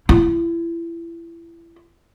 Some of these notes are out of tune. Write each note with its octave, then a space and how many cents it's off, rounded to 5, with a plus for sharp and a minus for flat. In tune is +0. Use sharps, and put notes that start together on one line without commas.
E4 +30